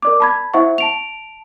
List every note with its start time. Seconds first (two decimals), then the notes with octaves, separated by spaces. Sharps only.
0.02 A#4 D5 D6
0.20 A5 B5 G#6
0.54 E4 C5 E5 F#5 C#6
0.78 A5 D7 F7